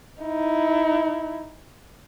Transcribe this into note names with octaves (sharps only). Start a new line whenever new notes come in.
D#4 E4